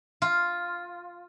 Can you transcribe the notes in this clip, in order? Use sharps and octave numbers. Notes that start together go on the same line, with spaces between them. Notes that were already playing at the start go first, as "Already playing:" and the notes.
F4